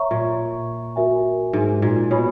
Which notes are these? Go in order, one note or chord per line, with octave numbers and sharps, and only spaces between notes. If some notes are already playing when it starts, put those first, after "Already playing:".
Already playing: C#5 E5 A#5 C#6
A#2
F#4 A#4 E5 G#5
G#2
A#2
B2 C#5 G#5 B5